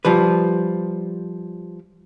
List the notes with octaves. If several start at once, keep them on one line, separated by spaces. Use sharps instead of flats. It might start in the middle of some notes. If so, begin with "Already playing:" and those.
F3 G3 B4